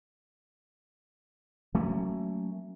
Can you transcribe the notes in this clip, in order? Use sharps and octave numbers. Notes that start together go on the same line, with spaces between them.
F#3 A3 A#3 C#4